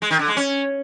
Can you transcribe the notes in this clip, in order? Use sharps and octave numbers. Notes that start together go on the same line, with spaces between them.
G#3
D#3
D3
G#3
C#4